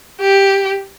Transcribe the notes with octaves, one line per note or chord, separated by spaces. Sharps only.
G4